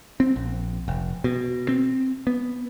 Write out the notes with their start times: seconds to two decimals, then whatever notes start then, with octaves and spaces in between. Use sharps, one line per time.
0.20 C4
0.36 A#1
0.88 F1
1.24 B2
1.69 C4
2.27 B3